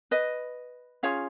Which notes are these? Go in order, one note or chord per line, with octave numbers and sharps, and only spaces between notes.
B4 D#5
C#4 F4 G#4 C#5 F5